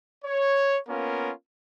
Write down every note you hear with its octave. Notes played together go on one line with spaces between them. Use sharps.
C#5
A#3 B3 C#4 F4 A#4